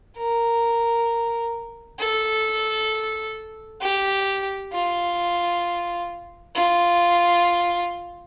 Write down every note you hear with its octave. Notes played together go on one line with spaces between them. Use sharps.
A#4
A4
G4
F4
F4